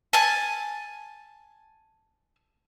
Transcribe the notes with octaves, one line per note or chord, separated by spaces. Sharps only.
G#5 A5